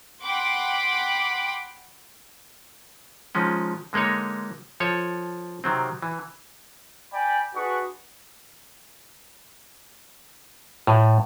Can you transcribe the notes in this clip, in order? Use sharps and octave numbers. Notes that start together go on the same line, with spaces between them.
F#5 G5 B5 C6 D6
D#3 F3 G#3 C#4
D3 G#3 A#3 D#4 C#5
F3 A4 C#5
C3 D#3 F#3 C4
E3
D5 G5 G#5 B5
D4 F#4 G#4 B4 C#6 D#6
A2